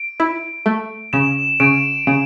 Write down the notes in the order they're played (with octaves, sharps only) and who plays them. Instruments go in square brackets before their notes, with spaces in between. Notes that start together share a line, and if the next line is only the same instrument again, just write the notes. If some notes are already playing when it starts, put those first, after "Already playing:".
Already playing: [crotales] D7
[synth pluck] E4
A3
[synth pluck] C#3 [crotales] E7
[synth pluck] C#3 [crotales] D7
[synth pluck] C#3 [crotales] D7